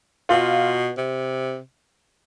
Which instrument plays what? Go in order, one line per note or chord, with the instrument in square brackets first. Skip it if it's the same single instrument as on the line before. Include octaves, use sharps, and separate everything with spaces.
[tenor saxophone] B2 [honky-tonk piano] F4
[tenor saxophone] C3